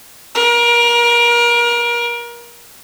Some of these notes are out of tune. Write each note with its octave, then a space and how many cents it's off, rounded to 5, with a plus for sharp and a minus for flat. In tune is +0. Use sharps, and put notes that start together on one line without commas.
A#4 +30